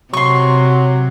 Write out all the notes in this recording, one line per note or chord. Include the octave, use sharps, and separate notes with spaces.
C3 F#3 C6 C#6